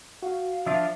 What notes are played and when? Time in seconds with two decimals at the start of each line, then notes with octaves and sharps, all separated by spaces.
0.22 F#4 F5
0.66 F3 D4 F4 E5